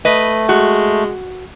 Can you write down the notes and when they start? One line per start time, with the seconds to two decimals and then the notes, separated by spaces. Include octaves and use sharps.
0.05 A3 B4 D#5
0.49 G#3 F#4